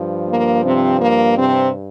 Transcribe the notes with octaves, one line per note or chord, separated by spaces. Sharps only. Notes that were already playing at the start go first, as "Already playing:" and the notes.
Already playing: G2 F3
A#3
C3 C4
A#3
C3 C4